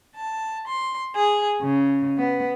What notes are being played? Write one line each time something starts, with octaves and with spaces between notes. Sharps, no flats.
A5
C6
G#4
C#3
B3